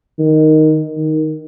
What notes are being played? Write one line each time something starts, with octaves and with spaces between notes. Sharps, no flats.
D#3
D#3